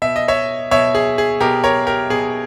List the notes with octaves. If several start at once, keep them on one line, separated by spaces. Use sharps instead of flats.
B2 E5
D#5
C#5 E5
B2 C#5 E5
G#4
G#4
B2 G4 A#4
A#4 C#5
G4 A#4
B2 G#4